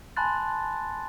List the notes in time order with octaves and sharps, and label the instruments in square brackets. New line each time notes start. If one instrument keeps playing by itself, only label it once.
[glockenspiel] G#5 A5 B5 C6 F#6 A6